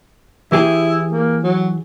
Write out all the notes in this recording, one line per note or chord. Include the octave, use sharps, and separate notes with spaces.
E3 E4 G4 G#4
A#3
F#3